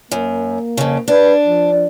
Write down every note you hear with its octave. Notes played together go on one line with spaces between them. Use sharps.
F#2 A#3
F2 C#3
D4 B4
F3